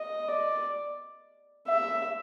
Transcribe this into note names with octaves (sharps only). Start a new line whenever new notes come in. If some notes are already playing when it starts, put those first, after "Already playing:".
Already playing: D#5
D5
E5